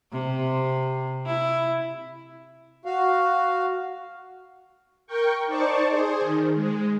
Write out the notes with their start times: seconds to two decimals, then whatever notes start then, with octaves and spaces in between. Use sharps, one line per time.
0.12 C3
1.26 E4
2.85 F#4 F5
5.07 A#4 G5 C#6
5.46 D#4 C5 D5 A5 C#6
5.87 G#4 C5
6.21 D#3
6.55 G#3